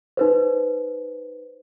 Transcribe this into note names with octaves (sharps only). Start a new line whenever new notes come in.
D#4 B4 C5